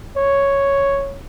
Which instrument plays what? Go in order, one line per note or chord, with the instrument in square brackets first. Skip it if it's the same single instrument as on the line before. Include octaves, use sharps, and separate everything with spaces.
[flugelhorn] C#5